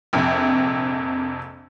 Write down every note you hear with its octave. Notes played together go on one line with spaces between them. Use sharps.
A#1 F2 C3